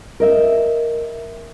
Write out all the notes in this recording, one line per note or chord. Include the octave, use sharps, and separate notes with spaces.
A#4 D#5 E5